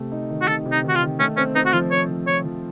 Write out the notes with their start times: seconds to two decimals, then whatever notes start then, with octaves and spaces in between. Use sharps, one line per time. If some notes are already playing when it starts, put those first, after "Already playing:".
Already playing: C3 A3
0.12 D#4
0.30 D#3
0.42 F#4
0.47 C3 A4
0.66 C3
0.72 D#4
0.83 D#3
0.89 F#4
0.95 F4
1.02 D#3
1.19 A3 C#4
1.37 C4 C#4
1.56 C4 D#4
1.66 F#4
1.73 F3 F4
1.91 C4 C#5
2.09 F3
2.27 F3 C#5
2.45 F3